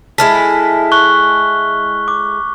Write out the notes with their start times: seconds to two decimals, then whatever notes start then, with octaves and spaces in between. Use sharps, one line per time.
0.18 G#3 E4 A4 F6 B6
0.92 C#6 F#6 G7
2.08 D6